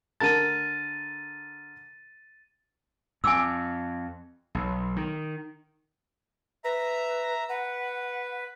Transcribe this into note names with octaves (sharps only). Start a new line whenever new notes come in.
D3 A#4 A5 A6 D#7
F2 G#5 D6 E6
B1
D#3
B4 E5 A#5
B4 F#5